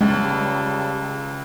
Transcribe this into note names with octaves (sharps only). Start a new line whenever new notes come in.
C#2 C#3 G3 G#3 A5